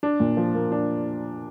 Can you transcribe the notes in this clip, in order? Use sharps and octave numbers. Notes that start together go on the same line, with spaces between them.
D4
A#2
F3
A#3
D4